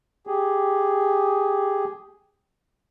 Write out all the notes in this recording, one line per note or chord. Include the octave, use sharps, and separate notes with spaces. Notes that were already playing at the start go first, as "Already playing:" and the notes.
G4 G#4